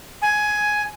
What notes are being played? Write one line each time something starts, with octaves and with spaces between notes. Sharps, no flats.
G#5